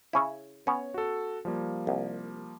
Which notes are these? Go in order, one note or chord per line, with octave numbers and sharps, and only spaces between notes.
C#3 C#4 E4
B3 C#4 C#5
F#4 A4
F3 G3 A#3
C2